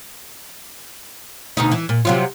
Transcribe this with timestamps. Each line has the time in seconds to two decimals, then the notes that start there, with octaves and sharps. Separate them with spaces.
1.57 D2 B2 D#4
1.72 E3
1.89 A#2
2.05 C3 F#3 F4